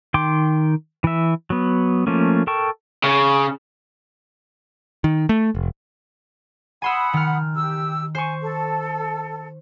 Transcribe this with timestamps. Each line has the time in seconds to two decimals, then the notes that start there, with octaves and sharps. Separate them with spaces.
0.14 D#3 G5 C6 D6
1.04 E3 E5
1.50 F#3 B3
2.07 F3 A3 A#3 C#4
2.47 A4 A#4 G5 A5 C#6
3.04 C#3
5.04 D#3
5.29 A3
5.55 F1
6.82 F#5 G#5 B5 C6 D#6 E6
7.13 D#3 F6
7.55 G4 E6
8.15 C5 G#5 C#6
8.41 A4